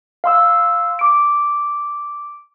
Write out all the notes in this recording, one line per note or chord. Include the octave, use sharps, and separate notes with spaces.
F5 C6 E6
D6 D7